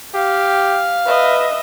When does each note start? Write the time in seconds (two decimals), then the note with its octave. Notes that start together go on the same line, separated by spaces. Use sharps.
0.15 G4 F5
1.06 B4 D#5 E5